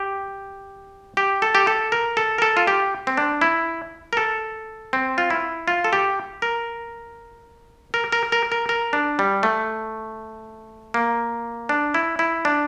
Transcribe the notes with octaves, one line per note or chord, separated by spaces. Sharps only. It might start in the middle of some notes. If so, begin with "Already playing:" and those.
Already playing: G4
G4
A4
G4
A4
A#4
A4
A#4
A4
F4
G4
C4
D4
E4
A#4
A4
C4
F4
E4
F4
A4
G4
A#4
A#4
A#4
A#4
A#4
A#4
D4
G3
A3
A#3
D4
E4
E4
D4